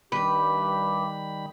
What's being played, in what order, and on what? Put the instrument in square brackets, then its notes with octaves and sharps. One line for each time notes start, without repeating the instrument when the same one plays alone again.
[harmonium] G2 G4 [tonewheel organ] D#3 G3 B5 [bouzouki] B4